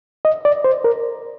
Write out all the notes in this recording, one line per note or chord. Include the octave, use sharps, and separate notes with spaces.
D#5
D5
C5
A#4